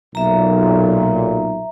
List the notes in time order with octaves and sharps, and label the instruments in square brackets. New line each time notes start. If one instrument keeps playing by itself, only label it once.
[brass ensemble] B1 A#2 [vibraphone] E5 A#5